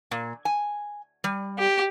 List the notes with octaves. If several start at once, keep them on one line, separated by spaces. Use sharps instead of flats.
A#2
G#5
G3
G4